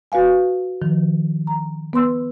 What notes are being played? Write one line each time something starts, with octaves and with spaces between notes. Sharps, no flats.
F#4 B4 F5 G#5
D#3 F3
A#5
B3 B4 C6 E6